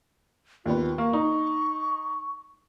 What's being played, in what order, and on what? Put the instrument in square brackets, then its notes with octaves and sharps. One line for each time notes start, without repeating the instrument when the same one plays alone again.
[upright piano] D#2 B3 [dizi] F4
[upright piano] A#3 [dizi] C#6
[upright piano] D#4